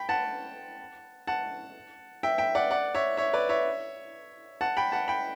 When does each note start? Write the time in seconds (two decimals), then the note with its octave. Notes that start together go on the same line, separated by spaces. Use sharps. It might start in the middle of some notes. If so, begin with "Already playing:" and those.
Already playing: G5 B5
0.09 F#5 A5
1.27 F#5 A5
2.23 E5 G5
2.38 E5 G5
2.55 D5 F#5
2.71 D5 F#5
2.95 C#5 E5
3.17 C#5 E5
3.33 B4 D5
3.49 C#5 E5
4.61 F#5 A5
4.77 G5 B5
4.92 F#5 A5
5.08 G5 B5